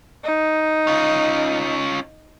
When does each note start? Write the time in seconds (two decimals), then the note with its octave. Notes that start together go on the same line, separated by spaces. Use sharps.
0.24 D#4
0.87 C#4 F4